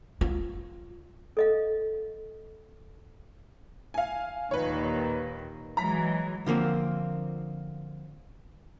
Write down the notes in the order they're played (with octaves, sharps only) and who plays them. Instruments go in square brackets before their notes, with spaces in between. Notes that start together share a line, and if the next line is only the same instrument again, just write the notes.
[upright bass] F4
[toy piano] A4 D#5 F5
[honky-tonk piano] F5 G#5
[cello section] D#2 A#2 D#3 [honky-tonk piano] B4 C#5
[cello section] E3 F#3 G#3 [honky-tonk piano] A#5 B6
[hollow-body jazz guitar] D3 F3 A#3 C4